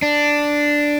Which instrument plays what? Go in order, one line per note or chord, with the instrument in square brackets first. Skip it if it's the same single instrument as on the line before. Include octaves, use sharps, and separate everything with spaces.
[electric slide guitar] D4